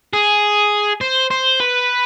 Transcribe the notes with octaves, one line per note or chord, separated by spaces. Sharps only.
G#4
C5
C5
B4